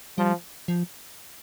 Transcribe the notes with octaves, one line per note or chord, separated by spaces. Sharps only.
F3 G3
F3